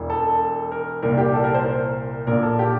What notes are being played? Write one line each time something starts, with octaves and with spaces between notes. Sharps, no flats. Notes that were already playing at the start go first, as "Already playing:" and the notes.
Already playing: E1 E2 E3
A4
A#4
C2 A#2 A#4
G4
A4
A#4
C5
A#4
A#1 A#2 A#4
A4
G4